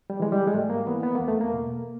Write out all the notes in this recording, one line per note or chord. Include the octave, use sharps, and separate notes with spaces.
G3
E3 G#3
G3
G#3
G#2 A3
A#3
E3 B3
B3
E2 A#3
A3
A#3
B2